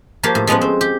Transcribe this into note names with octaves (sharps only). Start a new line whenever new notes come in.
F3 A#3 G4 C#5 F5
A2
F3 G#3 B3 C#4 F#5
C4
G4